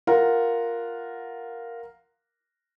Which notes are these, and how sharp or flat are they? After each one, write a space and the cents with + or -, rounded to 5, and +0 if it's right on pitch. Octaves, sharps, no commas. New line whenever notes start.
F4 +0 A#4 +0 F#5 +0